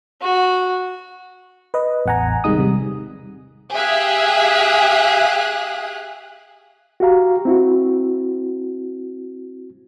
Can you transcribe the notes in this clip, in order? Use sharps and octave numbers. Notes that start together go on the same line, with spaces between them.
F#4
B4 D#5
A1 E2 F#5 G#5 A#5
C3 D#3 G3 G#3 D#4 D#6
C3 G3
G4 G#4 E5 F5 D#6 F#6
F#4 G4 F5 A#5
C4 E4 F#4